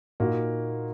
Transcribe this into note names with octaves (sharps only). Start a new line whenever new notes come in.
A#2 A#3 D#4 F#4